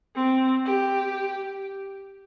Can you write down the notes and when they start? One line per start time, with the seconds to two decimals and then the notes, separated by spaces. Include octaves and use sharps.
0.15 C4
0.65 G4